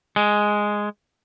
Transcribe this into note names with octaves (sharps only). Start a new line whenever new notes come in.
G#3